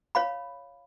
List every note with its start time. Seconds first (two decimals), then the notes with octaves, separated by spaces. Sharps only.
0.15 C#5 F5 B5